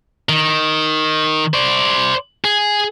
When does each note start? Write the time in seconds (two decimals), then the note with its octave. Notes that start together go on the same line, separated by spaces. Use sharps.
0.29 D#3
1.54 C5 D5
2.44 G#4